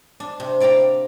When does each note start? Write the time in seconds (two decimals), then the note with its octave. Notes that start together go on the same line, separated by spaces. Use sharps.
0.20 D4
0.40 C3
0.60 E4 D5 F5 G5 A#5